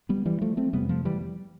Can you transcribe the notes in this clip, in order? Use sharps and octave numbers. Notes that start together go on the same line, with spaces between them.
G3 B3
E3 G3
F3 A3
A3 C4
F2 C3 G3 B3
F3 A3
E3 G3